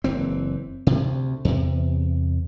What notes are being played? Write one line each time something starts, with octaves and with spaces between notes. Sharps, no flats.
F#1 E3 C4
D2 C3
E2 C3